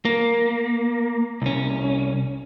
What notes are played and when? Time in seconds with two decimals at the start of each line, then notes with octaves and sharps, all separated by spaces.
0.05 A#3
1.42 C2 C#4